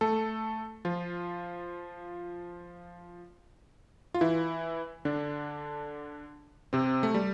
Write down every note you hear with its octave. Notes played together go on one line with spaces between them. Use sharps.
A3 A4
F3 F4
F4
E3 E4
D3 D4
C3 C4
A3
G3